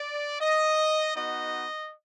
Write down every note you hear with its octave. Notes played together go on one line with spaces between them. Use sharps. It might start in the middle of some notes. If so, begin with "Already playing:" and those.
Already playing: D5
D#5
B3 D#4 F#4 D#5